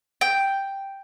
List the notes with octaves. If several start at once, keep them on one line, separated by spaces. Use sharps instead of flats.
G5